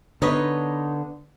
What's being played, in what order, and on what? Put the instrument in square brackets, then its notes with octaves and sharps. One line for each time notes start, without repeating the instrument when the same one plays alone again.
[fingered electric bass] D3 [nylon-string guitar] B3 B4 [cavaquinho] D#4 C#5 D#5